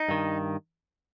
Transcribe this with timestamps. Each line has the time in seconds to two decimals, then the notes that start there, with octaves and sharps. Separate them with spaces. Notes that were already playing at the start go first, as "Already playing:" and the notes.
Already playing: D#4
0.09 G2 D#3